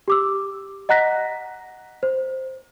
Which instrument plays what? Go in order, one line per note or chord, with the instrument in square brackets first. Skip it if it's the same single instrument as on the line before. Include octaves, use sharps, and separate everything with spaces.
[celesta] G4 D6 E6
D#5 F#5 A#5 F#6 A#6 B6
C5